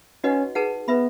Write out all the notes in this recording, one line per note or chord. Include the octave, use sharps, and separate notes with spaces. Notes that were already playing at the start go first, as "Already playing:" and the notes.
C#4 D#4 F#4 B4 D#5 F#5
D#4 G#4 B4 F#5 A5
B3 B4 E5 B5